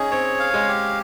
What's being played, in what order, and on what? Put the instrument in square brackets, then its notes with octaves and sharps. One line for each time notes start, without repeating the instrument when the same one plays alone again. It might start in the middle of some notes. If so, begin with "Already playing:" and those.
Already playing: [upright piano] C#4 D#4 [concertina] G#4
[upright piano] C4 [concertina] C#5
[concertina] F5
[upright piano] G#3
[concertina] G4